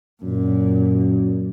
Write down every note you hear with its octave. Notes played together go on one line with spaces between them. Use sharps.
F#2 A#2